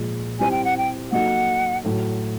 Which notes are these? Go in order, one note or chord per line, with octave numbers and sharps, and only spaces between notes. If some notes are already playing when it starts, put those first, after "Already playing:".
Already playing: A#2 F3 G#3
G3 C4 E4 G4 C5 G#5
G5
F#5
G5
F#3 A#3 D#4 F#4 A4 F#5
A2 F#3 A3